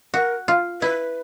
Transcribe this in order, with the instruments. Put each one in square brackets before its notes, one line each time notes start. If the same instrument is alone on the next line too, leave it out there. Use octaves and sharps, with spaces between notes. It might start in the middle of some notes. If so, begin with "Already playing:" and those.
[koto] F#4 [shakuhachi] A#4
[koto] F4
[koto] E4 [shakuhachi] B4